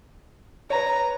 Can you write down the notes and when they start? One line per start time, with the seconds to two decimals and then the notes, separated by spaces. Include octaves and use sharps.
0.70 B4 C#5 A#5